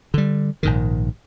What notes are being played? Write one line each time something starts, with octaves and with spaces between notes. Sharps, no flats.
D3 G3
A#1 G#2 D#3